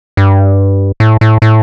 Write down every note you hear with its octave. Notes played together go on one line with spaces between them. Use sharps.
G2
A2
A2
A2